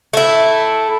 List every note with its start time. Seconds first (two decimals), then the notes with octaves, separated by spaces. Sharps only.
0.13 A3 E4